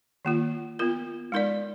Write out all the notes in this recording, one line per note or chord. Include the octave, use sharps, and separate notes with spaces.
D#3 A#3 F4
B3 F4 A#4
G#3 D#4 A#4 D5